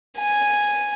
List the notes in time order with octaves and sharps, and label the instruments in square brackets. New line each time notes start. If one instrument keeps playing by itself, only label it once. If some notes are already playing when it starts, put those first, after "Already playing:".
[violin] G#5